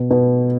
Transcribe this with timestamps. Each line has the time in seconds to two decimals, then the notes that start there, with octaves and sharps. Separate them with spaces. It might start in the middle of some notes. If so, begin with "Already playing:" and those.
Already playing: B2
0.11 B2